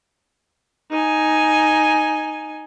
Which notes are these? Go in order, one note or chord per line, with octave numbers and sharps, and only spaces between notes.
D#4 G#5